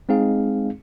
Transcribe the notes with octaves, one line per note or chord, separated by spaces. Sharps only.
G#3 C4 D#4 G#4 F5